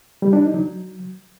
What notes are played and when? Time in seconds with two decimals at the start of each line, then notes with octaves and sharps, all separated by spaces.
0.22 G3
0.33 D4
0.43 D#4
0.54 F#3